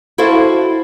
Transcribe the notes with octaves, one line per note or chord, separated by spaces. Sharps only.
E4 F#4 A4 C5 E5 F5